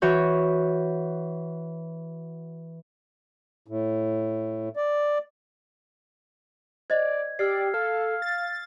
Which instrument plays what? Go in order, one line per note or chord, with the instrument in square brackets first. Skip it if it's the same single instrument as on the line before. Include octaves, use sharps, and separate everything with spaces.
[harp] E3 F#4 C#5 G6
[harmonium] A2
D5
[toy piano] C5 D#5 [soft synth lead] D5 [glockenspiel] G#6
[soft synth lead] G4 [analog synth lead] D5 [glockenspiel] E6 F6 C7
[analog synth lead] A4 [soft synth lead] F5 [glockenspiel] F6
[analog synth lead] A6